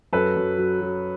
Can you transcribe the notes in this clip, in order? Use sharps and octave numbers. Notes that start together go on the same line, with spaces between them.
F#2 A4 B4
F#2
F#3
F#3